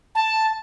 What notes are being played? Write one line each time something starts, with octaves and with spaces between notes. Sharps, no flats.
A5